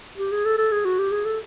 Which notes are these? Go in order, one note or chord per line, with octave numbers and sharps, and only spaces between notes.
G4
G#4
A4
A4
G#4
F#4
G4
G#4
A4